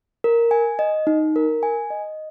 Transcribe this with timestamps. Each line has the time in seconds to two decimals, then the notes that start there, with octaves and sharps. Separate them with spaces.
0.24 A#4
0.51 G#5
0.79 D#5
1.07 D#4
1.36 A#4
1.63 G#5
1.90 D#5